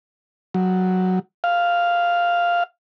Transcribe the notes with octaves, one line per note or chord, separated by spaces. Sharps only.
F#3
F5